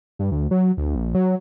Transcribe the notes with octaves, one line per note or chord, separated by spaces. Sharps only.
G2
D2
F#3
D2
A#1
F#3